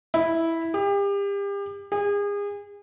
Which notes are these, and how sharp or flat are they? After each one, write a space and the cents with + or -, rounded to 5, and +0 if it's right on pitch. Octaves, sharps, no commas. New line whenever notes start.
E4 -5
G4 +35
G#4 -35